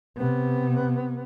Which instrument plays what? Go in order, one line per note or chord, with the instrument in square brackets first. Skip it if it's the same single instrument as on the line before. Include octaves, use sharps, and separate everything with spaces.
[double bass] C3 B3